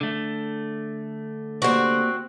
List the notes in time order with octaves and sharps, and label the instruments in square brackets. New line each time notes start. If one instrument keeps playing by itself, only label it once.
[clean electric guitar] D3 A3
[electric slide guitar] A#3 G4 D5 [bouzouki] C4 F#4